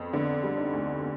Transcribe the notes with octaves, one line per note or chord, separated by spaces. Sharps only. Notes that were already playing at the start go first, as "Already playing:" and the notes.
Already playing: F2 B3 C4
D3 B3 D4
G3
C4 D#4
D2
B3